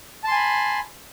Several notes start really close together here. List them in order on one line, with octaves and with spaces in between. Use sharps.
A5 C6 G#5 B5